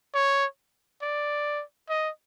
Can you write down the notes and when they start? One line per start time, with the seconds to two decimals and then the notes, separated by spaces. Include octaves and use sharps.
0.15 C#5
1.02 D5
1.89 D#5